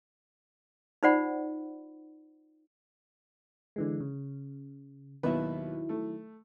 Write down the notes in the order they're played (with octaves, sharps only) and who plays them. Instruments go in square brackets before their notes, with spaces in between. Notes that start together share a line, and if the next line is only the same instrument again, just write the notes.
[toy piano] D#4 F4 C5 D5 F#5 B5
[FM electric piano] D3 E3 G#3
C#3
[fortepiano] D#2 B2 B4 [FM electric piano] D#3 F#3 E4
[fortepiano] A3